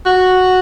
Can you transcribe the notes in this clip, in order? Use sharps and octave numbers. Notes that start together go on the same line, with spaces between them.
F#4